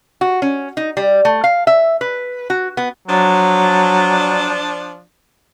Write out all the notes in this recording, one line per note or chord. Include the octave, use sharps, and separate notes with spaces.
F#4
C#4
D#4
G3
A3
F5
E5
B4
F#4
B3
F3 F#3 D4